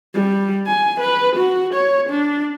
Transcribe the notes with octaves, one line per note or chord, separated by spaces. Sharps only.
G3
G#5
B4
F#4
C#5
D4